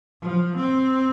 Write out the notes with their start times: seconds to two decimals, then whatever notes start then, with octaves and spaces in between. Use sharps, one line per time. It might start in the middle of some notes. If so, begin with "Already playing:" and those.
0.21 F3
0.56 C4